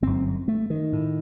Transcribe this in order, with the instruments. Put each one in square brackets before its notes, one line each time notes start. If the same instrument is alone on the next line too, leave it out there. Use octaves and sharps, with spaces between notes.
[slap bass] G1 F#2 C4
A3
D#3
A2